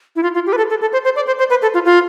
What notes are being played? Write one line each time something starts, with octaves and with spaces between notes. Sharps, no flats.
E4
F4
F4
G4
B4
A4
A4
A4
C5
C5
D5
C5
C5
B4
A4
F4
F4